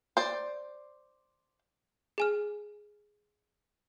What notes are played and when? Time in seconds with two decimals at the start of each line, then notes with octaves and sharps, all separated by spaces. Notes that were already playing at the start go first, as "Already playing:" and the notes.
0.17 C5 D5
2.18 G#4 G#5 F6